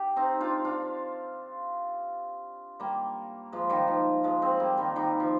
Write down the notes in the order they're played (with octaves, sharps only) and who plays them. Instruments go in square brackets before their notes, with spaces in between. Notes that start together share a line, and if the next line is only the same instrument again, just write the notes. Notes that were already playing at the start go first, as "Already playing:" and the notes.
Already playing: [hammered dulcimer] G4
C4 D#4
D4 F4
D4 F4
G3 A#3
F3 G#3
D#3 G3
F3
F3 G#3
G#3 C4
G3 A#3
D#3 G3
D#3 G3
F3